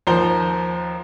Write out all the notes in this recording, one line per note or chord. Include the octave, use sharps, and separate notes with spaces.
D#2 F3 C5 A#5 G7